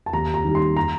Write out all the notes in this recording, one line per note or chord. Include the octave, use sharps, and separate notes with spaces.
A5
D#2 A#5
A#5
D#3 G3
C6
A#5